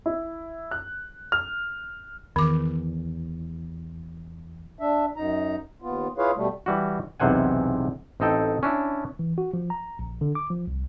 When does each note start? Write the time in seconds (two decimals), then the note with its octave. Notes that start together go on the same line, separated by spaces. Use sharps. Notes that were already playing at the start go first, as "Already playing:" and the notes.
0.06 E4
0.71 F#6
1.32 F6
2.36 E2 D#3 D6
4.78 D4 E5
5.16 F#2 D#4 A#5
5.82 D#2 B3 F4
6.18 E4 F4 G#4 B4 C#5 F5
6.36 B2 G3 A3
6.66 E3 G3 F#4
7.20 B1 E2 C3 C5 F#5 G#5
8.20 A1 C4 D#4 A4 G5
8.63 C#4 D4 E4
9.19 E3
9.38 F#4
9.53 F3
9.70 A#5
9.99 A#1
10.21 D3
10.35 D6
10.50 F3
10.67 C2